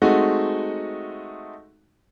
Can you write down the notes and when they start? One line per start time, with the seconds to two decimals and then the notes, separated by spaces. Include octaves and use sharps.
0.02 G#3 A3 C4 D#4 F#4